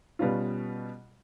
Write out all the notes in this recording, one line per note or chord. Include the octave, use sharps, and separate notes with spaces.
B2 G3 B3 C#4 F4